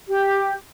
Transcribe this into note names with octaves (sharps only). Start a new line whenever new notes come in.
G4